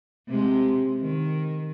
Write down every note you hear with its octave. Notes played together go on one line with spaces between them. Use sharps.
C3 G#3
D#3